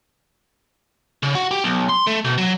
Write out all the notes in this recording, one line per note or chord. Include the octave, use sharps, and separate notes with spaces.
C#3
F#4
G4
B1
C6
A3
B2
F#3